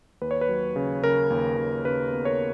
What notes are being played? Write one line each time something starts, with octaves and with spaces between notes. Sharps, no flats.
D#2 B4
C#5
B4
F#3
C#3
C#3 A#4
D#2
D#2
C#3 B4
B3
A#4 C#5